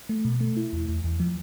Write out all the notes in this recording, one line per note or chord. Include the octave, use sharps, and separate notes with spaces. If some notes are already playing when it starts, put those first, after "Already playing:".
A3
B2
A3
E4
E2
E2
E2
F3